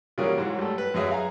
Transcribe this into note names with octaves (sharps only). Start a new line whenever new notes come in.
C#3 E3 F#3 G3 A#3 G#4
G#2 F#3
G3 A3
B4
F#2 F#3 G#4 E5
F5 G#5 A#5